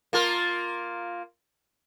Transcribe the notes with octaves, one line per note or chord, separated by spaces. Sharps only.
A#3 F4 A#4